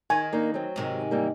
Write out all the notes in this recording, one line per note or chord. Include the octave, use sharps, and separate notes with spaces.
D#3 G#5
A#3 D4 D#4
F#3 C4
G#2 C3 D#3
E3 G3 A#3